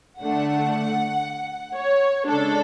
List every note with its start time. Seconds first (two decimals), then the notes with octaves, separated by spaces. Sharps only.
0.21 D3 A3 D4 F#5
1.76 C#5
2.28 C#3 G#3 D4 A4